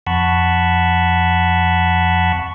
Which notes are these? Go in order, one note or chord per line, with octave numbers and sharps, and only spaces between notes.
F2 F#5 A5 B5 C#6